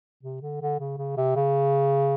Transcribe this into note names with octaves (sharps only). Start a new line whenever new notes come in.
C3
D3
D3
C#3
C#3
C3
C#3